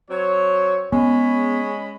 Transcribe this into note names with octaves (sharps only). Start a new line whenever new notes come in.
F#3 C4 C#5
G#3 B3 C#4 B5